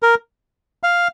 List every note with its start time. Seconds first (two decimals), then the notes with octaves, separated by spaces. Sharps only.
0.02 A#4
0.83 F5